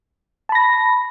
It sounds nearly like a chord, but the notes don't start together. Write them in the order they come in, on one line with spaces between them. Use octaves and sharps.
A5 B5 A#6